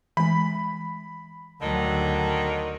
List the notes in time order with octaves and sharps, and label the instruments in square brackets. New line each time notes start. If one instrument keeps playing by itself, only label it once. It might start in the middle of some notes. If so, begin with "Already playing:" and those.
[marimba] E3 G#3 [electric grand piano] B5
[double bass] D2 F#3 [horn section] D3 D#3